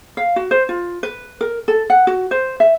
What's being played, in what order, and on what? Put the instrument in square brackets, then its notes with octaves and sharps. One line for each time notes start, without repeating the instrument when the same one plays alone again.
[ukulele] F5
F#4
C5
F4
B4
A#4
A4
F#5
F#4
C5
E5